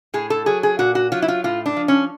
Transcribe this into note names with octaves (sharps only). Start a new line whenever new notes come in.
A2 G#4
A4
F#3 G#4
G#4
A#2 F#4
F#4
F#3 F4
E4
F4
A2 F4
D4
F3
C#4